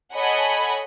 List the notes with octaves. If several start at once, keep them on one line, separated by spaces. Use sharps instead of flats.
A4 C#5 D#5 F#5 G#5 B5